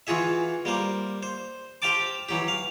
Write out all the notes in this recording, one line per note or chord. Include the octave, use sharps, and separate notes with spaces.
E3 F4 F#4 G#4 E5
G3 A#3 C5
C5
G4 C5 F5 G5 A5 D6
E3 F#3 G4
F5